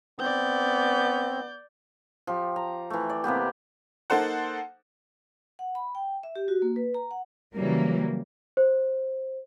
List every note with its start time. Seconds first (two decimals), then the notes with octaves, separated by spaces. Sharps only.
0.19 B3 C4 D5 G6
2.27 F3 G4
2.56 A#5
2.90 E3 A3
3.10 D5
3.24 C3 A#3 B3 G4
4.10 A#3 D#4 A4 C5 F#5
5.59 F#5
5.75 B5
5.95 G5
6.23 E5
6.36 G4
6.48 F#4
6.62 A#3
6.76 B4
6.94 A#5
7.11 F#5
7.53 C#3 E3 F#3 G3 A#3
8.57 C5